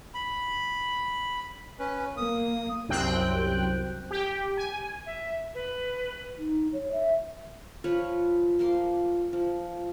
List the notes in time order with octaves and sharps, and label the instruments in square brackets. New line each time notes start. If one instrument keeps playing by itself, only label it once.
[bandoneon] B5
C#4 B4
[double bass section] A#3 [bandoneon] D#6
[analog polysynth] C2 F#2 C4 G5 F#6
G4 G5
G#5
[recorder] E5
B4
[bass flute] D#4
C#5
E5
[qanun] F3 F4 B4 C#5
F3 A#3 C6 D6
F3